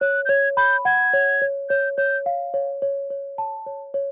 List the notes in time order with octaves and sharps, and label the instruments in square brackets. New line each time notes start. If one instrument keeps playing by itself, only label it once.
[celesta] C#5 [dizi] F#6
[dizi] G6
[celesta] C#5 [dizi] G#6
[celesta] B5 [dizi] G6
[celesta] F#5 [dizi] G#6
[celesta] C#5
C#5
[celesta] C#5 [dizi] G6
[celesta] C#5 [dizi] G6
[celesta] F5
C#5
C#5
C#5
A5
C#5
C#5